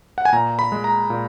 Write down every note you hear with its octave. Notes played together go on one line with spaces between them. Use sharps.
F#5
G#5
A#2 A#5
B5
G#3
A#5
A#2